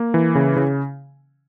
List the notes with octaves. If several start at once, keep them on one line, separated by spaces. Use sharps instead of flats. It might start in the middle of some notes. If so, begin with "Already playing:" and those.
Already playing: A#3
E3
C#3
C#3